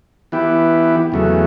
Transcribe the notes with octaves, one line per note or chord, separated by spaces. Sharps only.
E3 B3 E4 G4
E2 C#3 F#3 A3